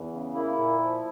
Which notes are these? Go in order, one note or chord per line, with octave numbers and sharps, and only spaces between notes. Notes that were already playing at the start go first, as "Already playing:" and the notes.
Already playing: E2
C#3
A#3 E4
A#2
F3